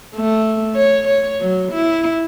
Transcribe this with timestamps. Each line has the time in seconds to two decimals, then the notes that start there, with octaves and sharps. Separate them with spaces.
0.16 A3
0.75 C#5
1.08 C#5
1.40 F#3
1.72 E4